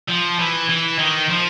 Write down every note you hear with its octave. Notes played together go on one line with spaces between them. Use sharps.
F3
E3
E3
D#3
F3